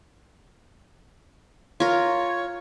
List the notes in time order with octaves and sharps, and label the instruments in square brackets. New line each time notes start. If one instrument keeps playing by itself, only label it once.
[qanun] F4 A#4 [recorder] C#5